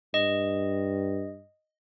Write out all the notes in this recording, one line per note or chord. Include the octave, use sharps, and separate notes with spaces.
G2 D#5